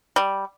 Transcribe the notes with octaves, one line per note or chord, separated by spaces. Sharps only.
G3